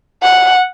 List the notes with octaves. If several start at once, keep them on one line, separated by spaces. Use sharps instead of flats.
F#5